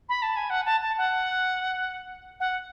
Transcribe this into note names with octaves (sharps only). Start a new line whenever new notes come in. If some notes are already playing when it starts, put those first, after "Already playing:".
B5
A5
G#5
F#5
A5
A5
F#5
F#5